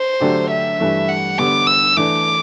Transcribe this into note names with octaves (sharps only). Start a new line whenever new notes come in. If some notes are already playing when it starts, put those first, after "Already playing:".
Already playing: C5
D3 F#3 A3 D4 G4
E5
G2 E3 A3
F#5
D3 G3 B3 D6
E6
E3 A3 D4 D6